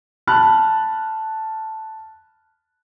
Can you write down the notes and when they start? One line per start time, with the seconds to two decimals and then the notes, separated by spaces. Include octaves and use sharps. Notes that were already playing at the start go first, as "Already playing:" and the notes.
0.27 A5 B5 F6 F#6